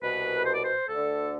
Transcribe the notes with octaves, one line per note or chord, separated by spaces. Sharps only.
C2 B2 B4
C5
D5
C5
D2 D3 A4